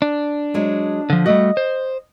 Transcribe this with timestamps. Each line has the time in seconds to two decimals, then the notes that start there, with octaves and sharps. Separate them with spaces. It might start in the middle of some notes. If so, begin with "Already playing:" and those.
0.02 D4
0.54 F#3 G#3
1.10 D3 F3
1.26 G3 A3 F#4 D#5
1.57 C5